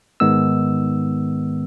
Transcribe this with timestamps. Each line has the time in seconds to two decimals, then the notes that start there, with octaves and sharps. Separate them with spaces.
0.20 G#2 D#3 G#3 B3 E6